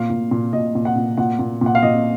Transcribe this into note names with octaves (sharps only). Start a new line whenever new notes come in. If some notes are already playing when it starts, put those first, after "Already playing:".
Already playing: A#2 F5
A#2
A#2
A#2 D#5
A#2
F#5
A#2
A#2 F#5
A#2
A#2 F#5
F5
A#2 D#5